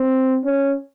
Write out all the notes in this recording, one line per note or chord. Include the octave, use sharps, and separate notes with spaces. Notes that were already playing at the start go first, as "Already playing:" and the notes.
Already playing: C4
C#4